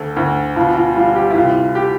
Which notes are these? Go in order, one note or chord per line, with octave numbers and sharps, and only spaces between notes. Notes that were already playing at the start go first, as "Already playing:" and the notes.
Already playing: D2 A4
D2
B2 F4
F4
G3 F4
G4
E4
C2 F4
G4